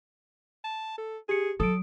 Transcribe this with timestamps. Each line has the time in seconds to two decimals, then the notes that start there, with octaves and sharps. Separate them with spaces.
0.64 A5
0.98 A4
1.29 G4 G#4 C#7
1.60 F#3 A4 D#6 D7